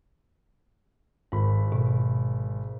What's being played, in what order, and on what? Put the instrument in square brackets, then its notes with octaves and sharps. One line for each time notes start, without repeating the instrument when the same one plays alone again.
[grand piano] G#1 B5 [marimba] G#2
[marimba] B2